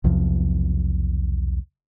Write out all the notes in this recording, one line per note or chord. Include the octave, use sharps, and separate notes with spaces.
B1 E2 C3 F3